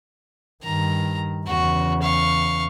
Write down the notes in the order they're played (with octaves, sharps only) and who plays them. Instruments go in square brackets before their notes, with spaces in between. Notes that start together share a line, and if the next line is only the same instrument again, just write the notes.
[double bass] G2 D#3 [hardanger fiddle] A#5
[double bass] E2 C#3 [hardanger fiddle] F#4
[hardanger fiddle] F5 C#6